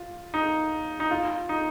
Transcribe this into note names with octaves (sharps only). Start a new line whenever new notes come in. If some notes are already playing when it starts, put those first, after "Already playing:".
Already playing: F4
D#4
D#4
F4
D#4